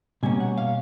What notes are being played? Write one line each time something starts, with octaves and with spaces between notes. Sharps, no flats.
B2 G3 A#3 C#4 G#5
F#5
F5